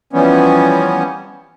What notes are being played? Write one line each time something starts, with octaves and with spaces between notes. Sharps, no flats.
E3 F3 G3 B3 C#4